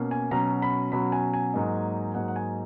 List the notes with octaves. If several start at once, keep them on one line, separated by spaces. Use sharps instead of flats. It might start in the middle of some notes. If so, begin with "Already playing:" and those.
Already playing: B2 A#3 C#4
G#5
B2 F#3 C#4 A#5
B5
B2 F#3 C#4 B5
G#5
G#5
G#2 F#3 A#3 D#4
G#2 F#3 A#3 D#4 F#5
F#5
G#5